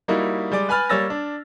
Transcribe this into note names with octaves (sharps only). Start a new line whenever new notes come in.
G3 A#3 D#4 E4 F#4
G3 G#3 D5 D6
B4 G#5 B5 F6 A6
G3 A#3 C#5 E6 A6 A#6
D4